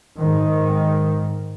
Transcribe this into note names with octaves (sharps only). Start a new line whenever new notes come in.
G#2 D#3